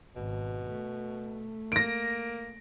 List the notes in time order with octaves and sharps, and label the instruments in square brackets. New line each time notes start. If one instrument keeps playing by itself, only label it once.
[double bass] G#1 [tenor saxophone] B2
[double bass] A3
[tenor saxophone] A#3 [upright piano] A#6 D7